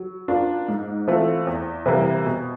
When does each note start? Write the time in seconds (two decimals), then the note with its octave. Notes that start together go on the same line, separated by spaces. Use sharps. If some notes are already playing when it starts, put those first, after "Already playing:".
Already playing: F#3
0.28 A#3 D4 F4
0.68 G#2
1.08 E3 A3 C4 F4
1.47 E2
1.86 C3 E3 G3 A#3
2.25 B2